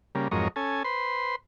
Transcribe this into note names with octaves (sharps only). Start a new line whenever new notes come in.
C#3 G3 A#3
F2 G#2 F#3 A#4 C#5 D#5
C#4 A4 G#5
B4 C5 C6